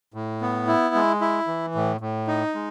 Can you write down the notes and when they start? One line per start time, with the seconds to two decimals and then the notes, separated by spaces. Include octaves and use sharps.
0.14 A2
0.41 B3
0.67 E4
0.95 G#3
1.21 E4
1.47 E3
1.75 A2
2.01 A2
2.27 D#4
2.55 G#3